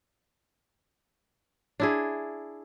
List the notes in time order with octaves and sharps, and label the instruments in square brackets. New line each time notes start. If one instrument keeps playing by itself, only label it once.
[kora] D4 E4 G#4